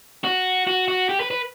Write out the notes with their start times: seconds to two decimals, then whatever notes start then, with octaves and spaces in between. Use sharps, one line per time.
0.24 F#4
0.67 F#4
0.88 F#4
1.09 G4
1.20 B4
1.31 B4